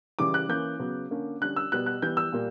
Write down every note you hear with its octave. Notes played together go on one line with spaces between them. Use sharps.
C#3 E3 G3 D6
F#6
E3 A#3 C#4 G6
C#3 F#3 B3
D3 A#3 C#4
D3 G3 C#4 F#6
E6
B2 G3 B3 F#6
F#6
E3 G3 B3 G6
E6
A#2 G3 A#3